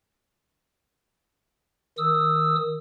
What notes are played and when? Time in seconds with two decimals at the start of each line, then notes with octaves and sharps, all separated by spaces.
1.98 D#3 D#6 E6